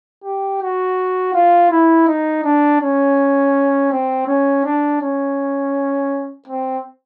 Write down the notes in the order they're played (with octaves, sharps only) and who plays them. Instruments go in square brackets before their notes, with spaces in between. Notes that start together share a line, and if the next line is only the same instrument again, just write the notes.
[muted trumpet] G4
F#4
F4
E4
D#4
D4
C#4
C4
C#4
D4
C#4
C4